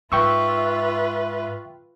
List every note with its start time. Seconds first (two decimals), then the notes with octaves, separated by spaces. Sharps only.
0.12 G#2 F4 B4 E5 G5 C#6 E6